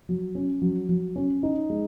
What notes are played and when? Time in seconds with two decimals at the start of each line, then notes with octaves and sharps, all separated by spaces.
0.09 F#3
0.35 C#4
0.62 F#3
0.89 F#3
1.16 C#4
1.43 D#4
1.70 G#3